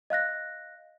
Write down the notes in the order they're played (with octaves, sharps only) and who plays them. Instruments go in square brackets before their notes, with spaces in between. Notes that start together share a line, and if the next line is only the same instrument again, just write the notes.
[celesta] D#5 F5 F#6 A#6